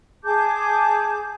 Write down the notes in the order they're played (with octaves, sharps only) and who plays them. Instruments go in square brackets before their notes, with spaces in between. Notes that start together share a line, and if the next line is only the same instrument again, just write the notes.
[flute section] G#4 A5 D6 G6